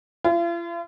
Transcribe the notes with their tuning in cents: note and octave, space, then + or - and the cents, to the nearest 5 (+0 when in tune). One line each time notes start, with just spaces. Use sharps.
F4 -45